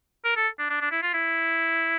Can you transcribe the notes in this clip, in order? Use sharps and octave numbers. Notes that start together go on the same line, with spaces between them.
A#4
A4
D4
D4
D4
E4
F4
E4